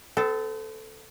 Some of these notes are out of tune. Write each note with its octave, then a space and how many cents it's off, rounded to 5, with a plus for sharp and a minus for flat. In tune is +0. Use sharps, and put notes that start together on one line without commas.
C4 -45 A4 +0